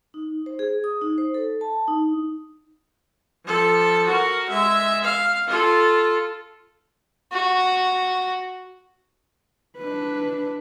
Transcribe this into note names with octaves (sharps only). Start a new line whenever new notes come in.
D#4
C5
G#4
D#6
D#4
C5
A4
A5
D#4
F3 A4
F#4 A#4
G#3 E5
F5
F4 A4
F#4
D4 B4